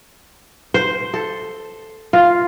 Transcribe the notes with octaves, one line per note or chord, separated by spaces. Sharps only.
C5
A4
F4